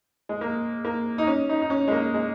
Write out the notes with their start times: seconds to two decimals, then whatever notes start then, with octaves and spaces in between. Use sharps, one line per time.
0.29 G#3
0.41 A#3
0.85 A#3
1.18 D#4
1.27 C#4
1.49 D#4
1.61 D#4
1.70 C#4
1.88 G#3
1.92 A#3
2.14 G#3